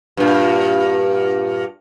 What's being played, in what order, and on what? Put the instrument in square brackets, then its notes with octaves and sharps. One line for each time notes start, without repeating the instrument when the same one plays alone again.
[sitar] G2 A#2